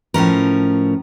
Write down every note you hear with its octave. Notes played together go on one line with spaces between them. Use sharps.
A2 F3 C#4 A#4